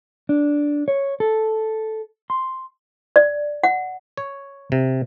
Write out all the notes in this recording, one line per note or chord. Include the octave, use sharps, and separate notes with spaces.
D4
C#5
A4
C6
D5
F#5
C#5
C3